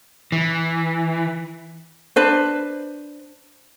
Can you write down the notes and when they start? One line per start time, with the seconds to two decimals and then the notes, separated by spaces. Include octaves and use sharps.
0.32 E3
2.16 D4 B4 C5